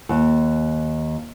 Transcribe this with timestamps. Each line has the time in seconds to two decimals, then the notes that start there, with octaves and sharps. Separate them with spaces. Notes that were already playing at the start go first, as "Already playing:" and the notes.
0.09 D#2